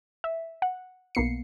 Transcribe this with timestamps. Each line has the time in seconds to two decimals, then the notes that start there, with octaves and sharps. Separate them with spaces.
0.24 E5
0.62 F#5
1.15 B1 A#3 B3 C7 C#7